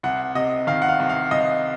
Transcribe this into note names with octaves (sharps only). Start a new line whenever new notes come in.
C2 F#5
C3 D#5
D#3 F5
F#5
F5
C2
F5
C2 D#5